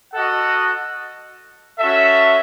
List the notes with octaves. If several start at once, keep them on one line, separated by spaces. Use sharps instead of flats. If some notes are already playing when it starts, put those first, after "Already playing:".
F#4 A4 D#5 F#5
C#4 F#4 A4 E5